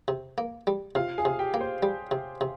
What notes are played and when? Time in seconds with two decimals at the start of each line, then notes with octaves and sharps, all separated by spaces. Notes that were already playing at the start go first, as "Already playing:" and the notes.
0.08 C3
0.38 A#3
0.67 G3
0.95 C3 F4 F5
1.18 G#4 G#5
1.25 C3
1.39 G4 G5
1.54 A#3
1.61 C5
1.83 G3
2.11 C3
2.41 C3